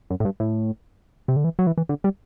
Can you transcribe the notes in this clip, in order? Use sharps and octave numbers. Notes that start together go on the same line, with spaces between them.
F#2
A2
G2
A2
C3
D3
E3
F#3
E3
E3
D3
G3